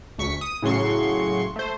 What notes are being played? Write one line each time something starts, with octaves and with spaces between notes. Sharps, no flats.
D2 C#6 B6 C#7
D#6
A2 C#3 F#3 C6 C#6
A3 C5